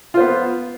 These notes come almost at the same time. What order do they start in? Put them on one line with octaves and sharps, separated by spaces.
F4 C5 B3